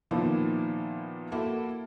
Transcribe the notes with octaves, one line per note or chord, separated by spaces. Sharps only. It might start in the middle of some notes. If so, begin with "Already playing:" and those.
A#2 D#3 F3 A#3 B3 E4
A#3 E4 F#4 A4